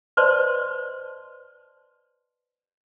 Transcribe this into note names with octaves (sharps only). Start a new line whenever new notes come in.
B4 C5 D5 D#5 A5 C6